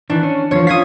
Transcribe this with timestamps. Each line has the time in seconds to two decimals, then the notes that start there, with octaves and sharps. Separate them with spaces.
0.10 D#3 E3 D4
0.23 C#4
0.51 E2 D3 F3 C#5
0.67 C#4 F4 D#6 G#6 B6